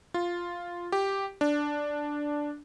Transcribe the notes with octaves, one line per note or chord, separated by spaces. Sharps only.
F4
G4
D4